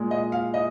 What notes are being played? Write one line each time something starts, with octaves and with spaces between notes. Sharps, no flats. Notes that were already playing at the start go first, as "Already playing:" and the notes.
Already playing: A#2 G#3
D#5
F5
D#5